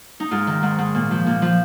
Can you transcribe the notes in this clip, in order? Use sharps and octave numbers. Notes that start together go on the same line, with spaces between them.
D#4
G#2 F4
D#3
G#2
G#2
A#2
F3
A#2
F3